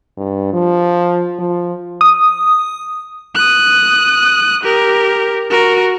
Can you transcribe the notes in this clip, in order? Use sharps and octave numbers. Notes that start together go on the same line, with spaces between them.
G2
F3
F3
D#6
D#6 F#6
G4 A#4
F#4 A#4